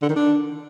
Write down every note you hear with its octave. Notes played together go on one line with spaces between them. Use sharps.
D3
D#3
D4